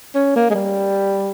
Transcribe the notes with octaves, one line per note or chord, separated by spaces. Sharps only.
C#4
A#3
G#3
G3